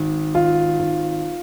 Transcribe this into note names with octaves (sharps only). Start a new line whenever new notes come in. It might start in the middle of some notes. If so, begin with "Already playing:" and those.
Already playing: G#1
G#1 F4
G#1